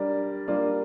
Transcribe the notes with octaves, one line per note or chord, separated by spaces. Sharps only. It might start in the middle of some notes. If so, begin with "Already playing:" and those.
Already playing: G3 D4 A#4 D5
G3 A#3 D4 F4 D5